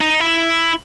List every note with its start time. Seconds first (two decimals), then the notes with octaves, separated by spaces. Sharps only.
0.01 D#4
0.20 E4